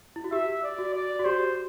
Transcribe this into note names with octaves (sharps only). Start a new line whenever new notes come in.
E4
F#4
G4 E5
D5
F#4
D5
F#4
G4 C5